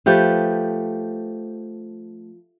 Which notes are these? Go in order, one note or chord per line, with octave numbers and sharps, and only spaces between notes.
F3 A3 G4 B4